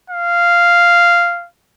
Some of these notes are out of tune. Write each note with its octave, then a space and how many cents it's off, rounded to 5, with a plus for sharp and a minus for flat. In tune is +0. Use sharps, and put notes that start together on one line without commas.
F5 -10